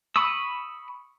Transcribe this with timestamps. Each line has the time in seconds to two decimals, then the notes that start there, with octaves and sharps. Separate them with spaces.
0.16 B5 C#6 D#6 E6